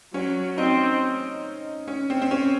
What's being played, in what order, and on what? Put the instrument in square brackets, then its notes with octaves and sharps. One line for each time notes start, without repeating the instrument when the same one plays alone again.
[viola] F#3 [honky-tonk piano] C#4
[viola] C4 [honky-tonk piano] D#4
[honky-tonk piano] C#4
C4
C4
C#4